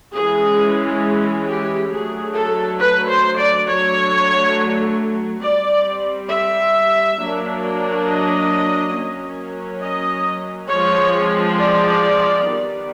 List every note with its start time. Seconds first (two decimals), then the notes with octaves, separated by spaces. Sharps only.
0.15 E3 G#3 C#4 G#4
1.47 G4
1.91 D3 F#3 A3 G#4
2.34 A4
2.79 B4
3.08 C5
3.37 D5
3.66 D3 F#3 A3 C#5
5.42 G3 C4 D5
6.30 E5
7.18 F#3 A#3 D4
8.06 D#5
8.94 F#3 A#3 C#4
9.82 D#5
10.69 F3 G#3 C4 C#5
11.58 D5
12.45 D#3 G3 B3